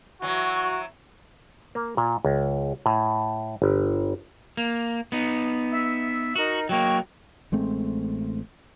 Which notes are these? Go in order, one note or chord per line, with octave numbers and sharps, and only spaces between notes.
E3 F#3 F#4
A#3
A#2
C#2
A2
G1
A#3
B3 D#4
E5 E6
D#4 F#4 A#4 D#5
F#3 A#3 D#5 G5 C#6
A1 G#3 A3 C4